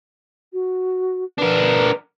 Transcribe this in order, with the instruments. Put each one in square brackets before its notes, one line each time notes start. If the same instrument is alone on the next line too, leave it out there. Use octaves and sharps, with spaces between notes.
[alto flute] F#4
[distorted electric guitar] D4 A#4 [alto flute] B4